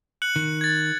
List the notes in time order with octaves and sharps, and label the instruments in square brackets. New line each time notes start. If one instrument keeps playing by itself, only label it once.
[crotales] F#6 C#7 F#7
[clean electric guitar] D#3
[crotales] G#6 A6